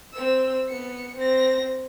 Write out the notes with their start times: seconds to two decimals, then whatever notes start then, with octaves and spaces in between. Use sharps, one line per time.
0.13 C4 E6
0.69 B3 C#7
1.16 C4 A#6